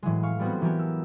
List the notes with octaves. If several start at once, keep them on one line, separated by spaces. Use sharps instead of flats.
A2 E3 F#3 G#3
F5 C#6
G3 G#3 B3 C4 F#4
E3 F#3 B3 G4 A#4
E6